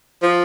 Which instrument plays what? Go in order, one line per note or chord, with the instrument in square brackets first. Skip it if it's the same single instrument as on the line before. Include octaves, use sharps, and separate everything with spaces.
[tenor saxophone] F3